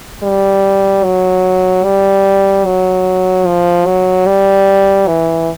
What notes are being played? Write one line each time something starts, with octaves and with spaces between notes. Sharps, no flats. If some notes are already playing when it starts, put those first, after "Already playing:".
G3
F#3
G3
F#3
F3
F#3
G3
E3